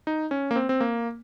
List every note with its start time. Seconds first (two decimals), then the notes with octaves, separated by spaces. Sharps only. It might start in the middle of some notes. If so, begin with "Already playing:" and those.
0.07 D#4
0.31 C#4
0.51 A#3
0.56 C4
0.69 C4
0.80 A#3